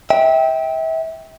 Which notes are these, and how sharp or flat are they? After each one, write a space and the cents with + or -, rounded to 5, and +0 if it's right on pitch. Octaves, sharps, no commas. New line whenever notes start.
E5 -30 G5 +0